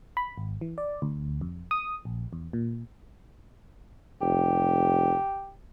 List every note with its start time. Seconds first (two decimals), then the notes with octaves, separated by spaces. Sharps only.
0.17 B5
0.38 G#1
0.61 E3
0.78 D5
1.02 D2
1.41 F2
1.71 D#6
2.05 A#1
2.33 E2
2.53 A#2
4.21 F1 G4